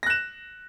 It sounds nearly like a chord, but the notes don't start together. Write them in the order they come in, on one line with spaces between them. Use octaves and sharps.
A#6 F#6 E7